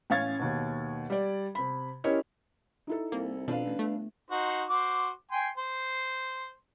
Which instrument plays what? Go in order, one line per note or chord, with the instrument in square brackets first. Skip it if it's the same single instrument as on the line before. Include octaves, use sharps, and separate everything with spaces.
[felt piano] A1 C#4 C#5 F5 G#6 A6
D#2 B2
G3 D5
C3 B5
C#4 E4 G4 A#4 C#5 D#5
D#4 E4 A4
[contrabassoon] C2 [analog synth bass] A#3
[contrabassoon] F2 [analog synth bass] B2 [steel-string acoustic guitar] D4 B4 F5
[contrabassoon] A1
[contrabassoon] G1 [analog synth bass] A3
[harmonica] D#4 F#4 C5
F#4 C5 D6
G5 G#5 C6
C5